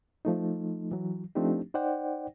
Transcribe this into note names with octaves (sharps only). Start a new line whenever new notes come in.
F3 A3 D#4
E3 F#3
F3 A3 C4 D4 D#4 G4
D#4 C5 D5 F#5 G5